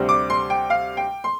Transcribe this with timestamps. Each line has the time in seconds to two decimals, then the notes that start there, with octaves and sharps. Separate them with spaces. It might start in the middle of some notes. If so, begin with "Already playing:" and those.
Already playing: D2 C3 G3 C4
0.09 D6
0.30 C6
0.50 G5
0.70 F5
0.97 G5
1.24 C6